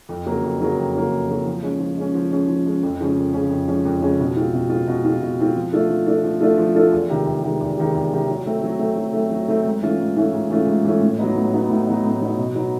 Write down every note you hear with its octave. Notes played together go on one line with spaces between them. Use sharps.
F2
C#3 F#3 A#3
F2
C#3 F#3 A#3
F2
C#3 F#3 A#3
F2
C#3 F#3 A#3
F3
G#3 C#4
F3
G#3 C#4
F3
G#3 C#4
F3
G#3 C#4
F2
C#3 F3 G#3 C#4
F2
C#3 F3 G#3 C#4
F2
C#3 F3 G#3 C#4
F2
C#3 F3 G#3 C#4
B2
G#3 C4 F4
B2
G#3 C4 F4
B2
G#3 C4 F4
B2
G#3 C4 F4
F3
A3 D4 F4 A4
F3
A3 D4 F4 A4
F3
A3 D4 F4 A4
F3
A3 D4 F4 A4
E2
C3 D#3 G#3
E2
C3 D#3 G#3
E2
C3 D#3 G#3
E2
C3 D#3 G#3
F#3
A3 C4
F#3
A3 C4
F#3
A3 C4
F#3
A3 C4
G#2
E3 A3 C#4 F4
G#2
E3 A3 C#4 F4
G#2
E3 A3 C#4 F4
G#2
E3 A3 C#4 F4
A2
F#3 B3 D#4
A2
F#3 B3 D#4
A2
F#3 B3 D#4
A2
F#3 B3 D#4
B2
F#3 B3 D#4